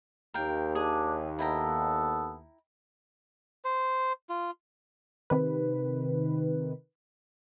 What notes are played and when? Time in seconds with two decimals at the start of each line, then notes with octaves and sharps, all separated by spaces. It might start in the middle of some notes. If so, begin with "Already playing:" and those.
0.34 D#2 A#4 F5 G5
0.75 D4 G#4
1.39 B3 E4 A4 G5 A#5
3.65 C5
4.29 F4
5.30 C3 D#3 B4